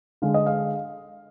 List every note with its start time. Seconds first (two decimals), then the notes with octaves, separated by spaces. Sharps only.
0.22 D3 G#3 F5
0.34 D#5
0.46 F5